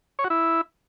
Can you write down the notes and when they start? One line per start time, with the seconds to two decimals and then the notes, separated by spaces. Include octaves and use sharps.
0.19 C#5
0.24 F#4
0.30 E4